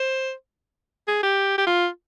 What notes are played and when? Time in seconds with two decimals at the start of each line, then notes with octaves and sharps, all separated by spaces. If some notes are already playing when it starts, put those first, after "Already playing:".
Already playing: C5
1.08 G#4
1.23 G4
1.58 G4
1.67 F4